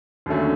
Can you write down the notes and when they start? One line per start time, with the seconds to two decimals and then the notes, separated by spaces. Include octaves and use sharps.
0.26 D#2 D3 F#3 A3 C#4